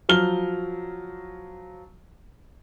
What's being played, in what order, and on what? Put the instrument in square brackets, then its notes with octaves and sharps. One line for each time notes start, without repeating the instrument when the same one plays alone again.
[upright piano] F3 F#3 F6 G7